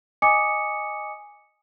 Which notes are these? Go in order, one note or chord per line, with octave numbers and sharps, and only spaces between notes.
D#5 G#5 D6 D#6 C#7